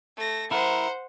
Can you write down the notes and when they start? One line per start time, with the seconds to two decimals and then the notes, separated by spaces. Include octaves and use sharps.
0.17 A3 A#6
0.51 E4 A#4 C5 F#5